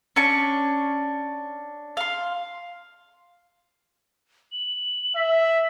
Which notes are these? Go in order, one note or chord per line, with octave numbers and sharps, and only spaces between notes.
C#4 D4 C#6
F5 C6
F#7
E5 B6